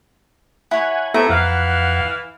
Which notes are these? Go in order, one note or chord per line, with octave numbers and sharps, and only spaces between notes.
E4 C#5 F#5 G#5
A2 A3 B3 C4 E4 A4 A#5
F2 E3 F5 F#5